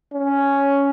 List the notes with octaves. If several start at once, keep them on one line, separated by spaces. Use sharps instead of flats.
C#4